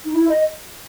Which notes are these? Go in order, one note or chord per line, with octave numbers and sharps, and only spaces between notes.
D#4
E4
D#5